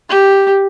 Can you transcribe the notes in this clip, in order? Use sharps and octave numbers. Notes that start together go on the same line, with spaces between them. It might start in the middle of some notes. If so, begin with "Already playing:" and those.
G4